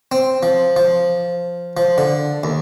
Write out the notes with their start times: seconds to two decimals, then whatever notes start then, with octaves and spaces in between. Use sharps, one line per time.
0.12 C4
0.43 F3
0.76 F3
1.77 F3
1.98 D3
2.44 D#2